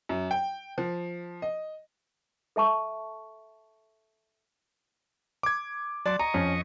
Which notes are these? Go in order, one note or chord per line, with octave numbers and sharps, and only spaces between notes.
F#2
G5
F3
D#5
A4 E5 A5 C#6
D6 G#6
F#3 D5 A5 C6 D6
D#5 A#5 C#6
F2 C#4